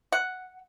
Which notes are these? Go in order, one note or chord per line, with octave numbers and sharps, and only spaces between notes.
F#5